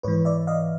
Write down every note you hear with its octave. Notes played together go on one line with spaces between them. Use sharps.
G#2 E3 B4 C#5
D5 E5
D#5 F5